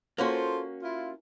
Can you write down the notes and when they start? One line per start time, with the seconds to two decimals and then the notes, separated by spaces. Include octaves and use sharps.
0.18 A#3 C#4 F4 F#4 A4 C5
0.82 E4 F4